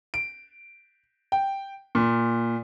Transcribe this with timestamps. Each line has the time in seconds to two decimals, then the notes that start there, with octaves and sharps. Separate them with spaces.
0.14 D7
1.32 G5
1.95 A#2